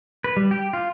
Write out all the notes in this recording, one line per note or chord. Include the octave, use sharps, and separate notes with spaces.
B4
G3
G4
F4